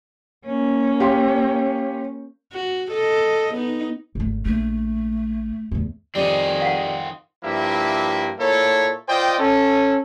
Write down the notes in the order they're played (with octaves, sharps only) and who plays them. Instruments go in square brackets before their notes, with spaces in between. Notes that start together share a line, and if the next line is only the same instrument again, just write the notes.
[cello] A#3 C#4
[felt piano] G4 F5 C6
[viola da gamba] F#4
A4 D#5
B3 D#4
[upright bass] G#1 A3
[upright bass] A#1 [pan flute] A3
[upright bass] E2 A3
[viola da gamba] F2 D#3 D#5 [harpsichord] G3 [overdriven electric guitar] C4 G#4
[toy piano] F5 F#5
[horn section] G2 F3 A#3 E4 G4 E5
A#2 A#3 E4 A4 C#5
F4 C5 D5 D#5 G5
C#4 A4